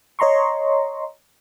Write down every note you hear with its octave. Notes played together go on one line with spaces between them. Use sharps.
C#5 D#5 A#5 C6 C#6